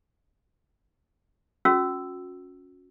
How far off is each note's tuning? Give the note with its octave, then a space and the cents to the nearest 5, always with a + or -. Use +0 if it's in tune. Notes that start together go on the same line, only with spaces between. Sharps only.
C#4 +0 F#4 -35 E6 +0